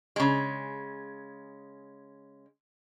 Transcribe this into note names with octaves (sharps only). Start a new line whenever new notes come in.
C#3 G#3